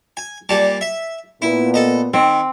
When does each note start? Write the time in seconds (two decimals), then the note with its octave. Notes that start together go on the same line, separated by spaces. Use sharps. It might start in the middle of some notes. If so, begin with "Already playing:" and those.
0.17 G#5
0.49 A#2 G3 A5
0.81 E5
1.42 A#2 B3 E4
1.74 A4 D#5
2.14 D#3 C4